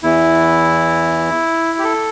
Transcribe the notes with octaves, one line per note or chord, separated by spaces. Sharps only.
E2 E3 E4
G4
A4